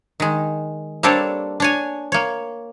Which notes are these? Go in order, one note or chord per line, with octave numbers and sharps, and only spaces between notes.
D#3 G#3
G3 A#3 C4 D4 A4 C#5
D4 C#5 G#5
A#3 C#5